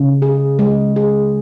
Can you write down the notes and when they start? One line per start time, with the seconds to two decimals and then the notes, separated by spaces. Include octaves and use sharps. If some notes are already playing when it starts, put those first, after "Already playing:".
Already playing: C#3
0.22 G#4
0.59 G#3
0.96 G#4